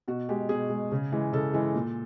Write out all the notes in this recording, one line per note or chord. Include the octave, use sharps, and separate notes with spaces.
B2 F#4
G#3 G4
B2 G#4
G#3
C#3
E3 G#3
C#3 A4
E3 G#3
A#2